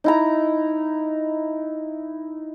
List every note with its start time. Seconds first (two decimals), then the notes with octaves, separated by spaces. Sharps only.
0.04 D#4 E4 A#5